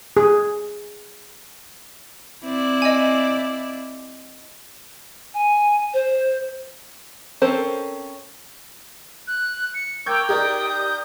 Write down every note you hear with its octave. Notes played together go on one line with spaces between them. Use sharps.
G#4
C4 E4 D5
D#5 G#5
G#5
C5
C4 C#4 A4 A#4 C5
F#6
C#7
A#4 G5 C#6 D6 E6 G6 G#6
D#4 G4 A#4 D5 D#6
G6